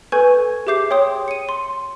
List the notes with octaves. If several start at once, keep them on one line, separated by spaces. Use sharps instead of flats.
A4 B4 G#5 C#6 G6 G#6
G4 G#4 E5 D6 G6 C7
C#5 G5 C6 D#6
C#7 D#7
C6